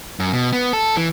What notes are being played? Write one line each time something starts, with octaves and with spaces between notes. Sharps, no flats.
F#2
B2
B3
A4
E3